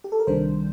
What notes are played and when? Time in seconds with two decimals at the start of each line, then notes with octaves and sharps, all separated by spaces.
0.04 G4
0.12 A4
0.20 A#4
0.27 C2 C3 D#3 G3 D4 C5